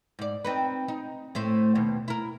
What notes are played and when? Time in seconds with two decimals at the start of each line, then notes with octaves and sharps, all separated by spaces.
0.19 G#2 D5
0.45 C4 D#4 B4
0.88 D#4
1.35 A2 A3 C5
1.75 D#2 B2
2.08 E4 A#4